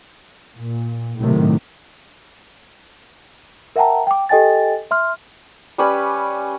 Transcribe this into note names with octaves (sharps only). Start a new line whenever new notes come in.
A#2
A2 C3 D#3 F#3 A3
A#4 E5 F#5 G5 A5 A#5
G5 D6
G4 A4 D#5 G5 G#5 A6
E5 C6 F6
G3 C#4 B4 B5